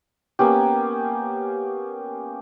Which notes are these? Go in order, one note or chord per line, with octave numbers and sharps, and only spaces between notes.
A#3 B3 C#4 G4